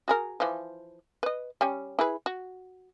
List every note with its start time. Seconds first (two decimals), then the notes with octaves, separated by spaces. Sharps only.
0.08 F#4 G#4 A#4
0.40 E3 F3
1.23 B4 D#5
1.61 G3 C#4
1.99 E4 G#4 B4
2.26 F#4